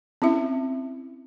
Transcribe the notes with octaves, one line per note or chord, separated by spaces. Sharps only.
C4 C#4 E4 E5